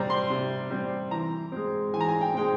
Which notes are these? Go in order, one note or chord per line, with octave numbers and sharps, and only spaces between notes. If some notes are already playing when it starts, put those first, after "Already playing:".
Already playing: C3 G3 C4 A#5
C6
C3
G3 C4
E3 A#5
G#3 C4
E3 G#5
A#5
G#5
G5
G#3 C4 G5